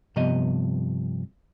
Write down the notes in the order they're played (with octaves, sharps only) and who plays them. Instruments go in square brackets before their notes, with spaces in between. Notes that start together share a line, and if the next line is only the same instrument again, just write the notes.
[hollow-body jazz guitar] G2 C3 F3 B3 D#5